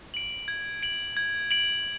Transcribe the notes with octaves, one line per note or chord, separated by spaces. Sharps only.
D7 F#7
G#6
D7 F#7
G#6
D7 F#7